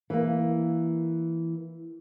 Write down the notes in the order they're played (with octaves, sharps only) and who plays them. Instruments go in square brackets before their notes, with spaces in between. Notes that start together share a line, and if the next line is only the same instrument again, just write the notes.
[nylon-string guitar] E3 A#3